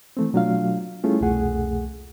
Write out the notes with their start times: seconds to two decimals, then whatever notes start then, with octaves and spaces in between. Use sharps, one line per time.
0.17 E3 A3 C4
0.33 B2 F#3 A3 D4 F4 F5
1.04 G3 A3 C#4 E4 F4 G#4
1.21 C2 F2 B2 A3 G#4 F#5